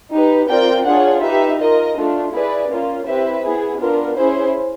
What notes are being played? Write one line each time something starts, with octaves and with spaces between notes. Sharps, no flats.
D#4 G4 B4
C4 F4 A#4 D5 G5
D4 F4 G#4 C#5 F#5
D#4 G4 B4 E5
F4 A#4 D#5
A3 D4 F4
E4 G#4 B4 D5
A#3 C#4 F4
C4 E4 G4 B4 E5
B3 E4 G#4
B3 D4 F4 A#4
C#4 E4 G#4 C5